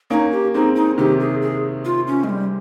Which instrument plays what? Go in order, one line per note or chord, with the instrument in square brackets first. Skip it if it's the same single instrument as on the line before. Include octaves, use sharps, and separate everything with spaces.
[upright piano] A#3 C#4 [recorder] D#4
[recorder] G4
[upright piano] G#3 C4 [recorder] D#4
[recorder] D#4
[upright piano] C3 D#3 [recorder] G4
[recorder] G#4
G#4
F4
C#4
G#3
G3